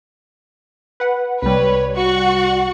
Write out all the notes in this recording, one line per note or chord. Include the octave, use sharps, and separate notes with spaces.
B4 F#5
C2 G3 B4 C#5
F#4 F#5 C#6